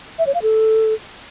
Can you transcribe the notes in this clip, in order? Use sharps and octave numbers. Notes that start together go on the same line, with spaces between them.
E5
C#5
F5
A4